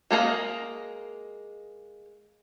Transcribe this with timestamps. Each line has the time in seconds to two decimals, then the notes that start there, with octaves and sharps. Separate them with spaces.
0.11 G#3 A#3 A4 A#4 D#5